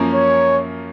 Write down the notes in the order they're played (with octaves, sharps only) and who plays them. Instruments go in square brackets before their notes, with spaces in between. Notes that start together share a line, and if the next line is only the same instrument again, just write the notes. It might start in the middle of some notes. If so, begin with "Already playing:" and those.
Already playing: [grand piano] F#2 F3 A#3 C#4
[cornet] C#5